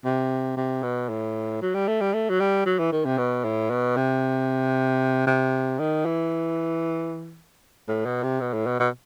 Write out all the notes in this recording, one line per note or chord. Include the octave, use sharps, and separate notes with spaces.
C3
C3
B2
A2
F#3
G3
A3
G3
A3
F#3
G3
F#3
E3
D#3
C3
B2
A2
B2
C3
C3
D#3
E3
A2
B2
C3
B2
A2
B2
B2